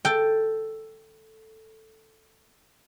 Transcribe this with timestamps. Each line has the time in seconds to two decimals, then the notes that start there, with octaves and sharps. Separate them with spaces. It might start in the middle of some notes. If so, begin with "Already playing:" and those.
0.05 A4 G5